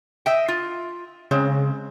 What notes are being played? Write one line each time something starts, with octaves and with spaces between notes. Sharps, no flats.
D#5 E5 G5
F4
C#3 G#3 C4